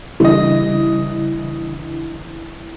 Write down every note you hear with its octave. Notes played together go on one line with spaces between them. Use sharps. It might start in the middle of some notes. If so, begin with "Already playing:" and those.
C#3 E3 G3 D4 D#5